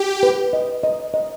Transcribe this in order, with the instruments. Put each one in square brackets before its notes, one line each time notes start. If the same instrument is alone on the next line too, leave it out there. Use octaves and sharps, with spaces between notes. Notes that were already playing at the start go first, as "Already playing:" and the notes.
Already playing: [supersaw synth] G4
[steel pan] B4
D#5
D#5
D#5